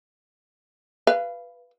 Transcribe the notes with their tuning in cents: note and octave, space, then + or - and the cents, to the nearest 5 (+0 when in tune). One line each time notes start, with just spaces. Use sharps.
B4 +0 F5 -25